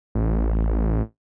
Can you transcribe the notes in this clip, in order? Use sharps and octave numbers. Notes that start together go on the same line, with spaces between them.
A1